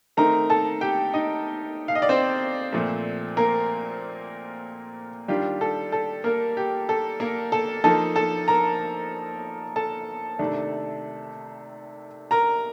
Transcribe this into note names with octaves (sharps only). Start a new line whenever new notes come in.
D#3 A3 C4 D#4 A#4 A#5
A4 A5
G4 G5
D#4 D#5
F5
D#5
D5
C4 C5
A#2 F3 A3
A#3 A#4
D#3 G3 D4 F4 G4
A4
A4
A#3 A#4
G4
A4
A#3 A#4
A4 A5
F3 A#3 D#4 A4 A5
A4 A5
A#4 A#5
A4 A5
C3 D#3 A3 D4
A#4 A#5